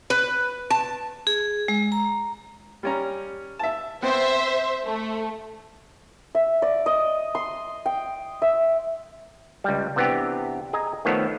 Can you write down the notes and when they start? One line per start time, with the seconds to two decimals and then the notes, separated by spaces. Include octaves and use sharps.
0.10 B4
0.70 A5
1.27 G#4
1.68 G#3
1.92 A#5
2.83 G3 C#4 A#5
3.59 E5 A5
4.02 B3 C4 C5 E5
4.84 A3
6.35 E5
6.62 D5
6.86 D#5
7.35 C6
7.86 G5
8.42 E5
9.64 C#2 G3
9.96 C3 E3 B3 D4 G4
10.73 G#4 D#5 G#5 A#5
11.05 D#3 F3 A3 B3 A4 C#5